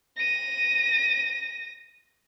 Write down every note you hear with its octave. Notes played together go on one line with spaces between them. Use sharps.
A#6 D#7